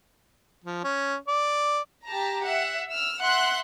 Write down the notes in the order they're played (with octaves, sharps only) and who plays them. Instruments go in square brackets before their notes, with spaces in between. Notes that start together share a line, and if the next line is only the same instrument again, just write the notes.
[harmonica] F3
C#4
D5
[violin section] G4 A5 A#5
E5 F#5
E6 F6
E5 F#5 C6 F#6